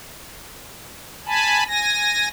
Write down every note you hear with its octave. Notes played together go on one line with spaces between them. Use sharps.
G#5 A5 B5
G#5 A#6